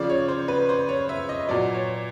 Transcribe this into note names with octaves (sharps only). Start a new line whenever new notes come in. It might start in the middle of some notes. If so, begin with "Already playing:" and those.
Already playing: C#3 F3 D5
C#5
C5
B4
C5
C#5
E5
D#5
A#2 F#3 D5
C#5